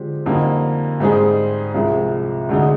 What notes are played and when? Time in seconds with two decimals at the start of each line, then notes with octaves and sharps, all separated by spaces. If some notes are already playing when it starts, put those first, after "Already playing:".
Already playing: D3 F3 G#3 C4 G4
0.26 F2 D3 G3 A#3 D#4
1.00 G#2 G3 C4 D#4 G#4
1.74 C2 C3 F3 G#3
2.49 D2 D3 G#3 D#4